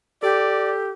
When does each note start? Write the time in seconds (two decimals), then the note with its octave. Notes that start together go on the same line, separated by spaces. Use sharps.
0.23 G4 A4 D5